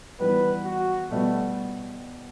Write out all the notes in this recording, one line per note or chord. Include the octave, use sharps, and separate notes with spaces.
E3 G3 B3 B4
F#4
B2 G3 A3 B3 F#4